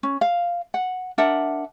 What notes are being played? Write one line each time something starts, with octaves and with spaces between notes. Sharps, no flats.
C#4
F5
F#5
D4 A#4 E5 F#5